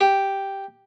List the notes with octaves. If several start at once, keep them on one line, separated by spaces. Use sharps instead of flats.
G4